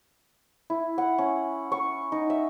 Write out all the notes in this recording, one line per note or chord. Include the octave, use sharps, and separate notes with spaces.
E4
F#5
C#4
C#6
D#4
E5